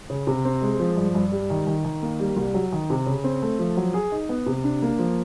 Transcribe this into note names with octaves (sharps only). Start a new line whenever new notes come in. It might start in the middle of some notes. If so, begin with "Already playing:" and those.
C#3
C3
C4
G#3
F3
G2
G2
G3
D#3
D#3
D#3
A#3
G3
C2
F#3
D#3
C3
C#3
C4
A3
F3
F#3
G#4
D#4
B3
C3
D4
A#3
F3